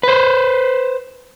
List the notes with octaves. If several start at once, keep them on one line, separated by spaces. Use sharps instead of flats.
B4 C5